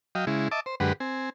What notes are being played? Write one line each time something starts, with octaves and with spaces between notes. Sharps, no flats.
F#3 D#5 F5 G5
C#3 G#3 E4
D#5 E5 A5 D6
C5
F#2 D3 G#3 G4 B4 F#5
C4 G#5